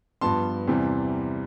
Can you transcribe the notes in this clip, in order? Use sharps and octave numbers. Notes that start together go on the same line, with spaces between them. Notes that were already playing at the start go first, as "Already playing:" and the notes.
G2 F3 B3 A5 C6
E2 C3 E3 G3 C4